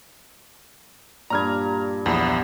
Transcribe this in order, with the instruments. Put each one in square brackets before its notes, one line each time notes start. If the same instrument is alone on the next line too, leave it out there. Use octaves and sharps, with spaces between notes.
[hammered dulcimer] G2 A#2 [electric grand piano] A#5 F6 G#6
[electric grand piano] A#1 E2 [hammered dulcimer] B3